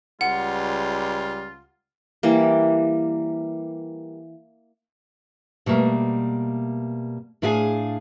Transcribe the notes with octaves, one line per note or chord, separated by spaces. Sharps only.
C#2 G3 F4 F#5
E3 G3 A#3
B2 G3 A3 A#3
A2 D4 E4 G#4 F5 G#5